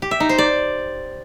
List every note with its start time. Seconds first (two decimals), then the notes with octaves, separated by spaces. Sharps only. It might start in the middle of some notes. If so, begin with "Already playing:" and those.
0.02 G4
0.11 E5
0.20 D#4
0.29 C5
0.38 D5